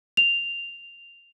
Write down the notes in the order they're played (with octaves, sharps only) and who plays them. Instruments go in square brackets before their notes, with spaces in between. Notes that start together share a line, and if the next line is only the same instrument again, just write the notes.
[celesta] F7